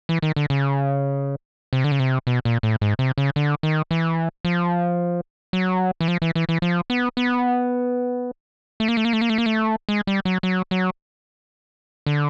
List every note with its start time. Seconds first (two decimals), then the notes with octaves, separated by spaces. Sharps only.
0.09 E3
0.22 D#3
0.36 D3
0.50 C#3
1.73 C3
1.84 D3
1.92 C#3
2.00 C3
2.27 B2
2.45 A#2
2.63 A2
2.81 G#2
2.99 C3
3.18 C#3
3.36 D3
3.63 D#3
3.91 E3
4.45 F3
5.53 F#3
6.01 E3
6.08 F3
6.22 E3
6.35 E3
6.49 E3
6.62 F3
6.90 B3
7.17 B3
8.80 A3
8.88 A#3
8.97 A3
9.05 A#3
9.13 A3
9.21 A#3
9.30 A3
9.38 A#3
9.46 A3
9.89 G#3
10.07 G3
10.25 F#3
10.43 F#3
10.71 F#3
12.06 D3